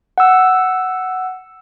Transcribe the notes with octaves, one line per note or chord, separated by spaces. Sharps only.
F#5 E6